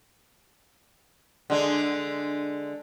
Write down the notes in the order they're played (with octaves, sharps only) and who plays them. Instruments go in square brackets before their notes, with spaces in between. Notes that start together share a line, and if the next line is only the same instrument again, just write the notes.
[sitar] D3 G#3